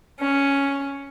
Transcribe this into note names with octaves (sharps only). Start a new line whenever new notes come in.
C#4